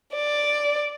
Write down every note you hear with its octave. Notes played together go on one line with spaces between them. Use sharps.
D5